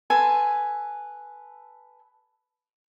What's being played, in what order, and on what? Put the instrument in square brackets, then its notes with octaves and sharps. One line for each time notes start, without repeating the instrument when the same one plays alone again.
[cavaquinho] A4 B4 G#5 C6